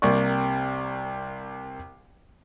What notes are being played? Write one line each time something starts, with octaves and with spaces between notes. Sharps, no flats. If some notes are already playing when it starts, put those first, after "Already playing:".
C2 C3 A#3 D5 C#6